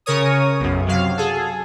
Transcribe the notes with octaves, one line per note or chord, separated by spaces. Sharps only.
C#3 A#4 C#5 D#6
B1 F#2
C3 F#3 F5
G#4 A4